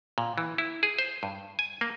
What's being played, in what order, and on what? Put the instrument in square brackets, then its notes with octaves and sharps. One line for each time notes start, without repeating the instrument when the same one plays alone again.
[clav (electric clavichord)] A#2
E3
E4
G#4
C5
G2
G#5
A#3